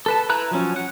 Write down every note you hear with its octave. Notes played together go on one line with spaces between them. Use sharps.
A4 B4 A5
E4 B4 A#5 F#6
F3 F#3 C#4
F#5